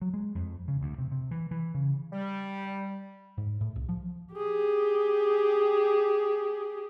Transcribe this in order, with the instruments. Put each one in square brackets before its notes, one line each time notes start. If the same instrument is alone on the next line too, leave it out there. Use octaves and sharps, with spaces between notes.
[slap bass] F#3
G#3
F2
C#3
D2
C3
C3
E3
E3
C#3
[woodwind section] G3
[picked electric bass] G#2
A2
C2
F3
[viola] G4 G#4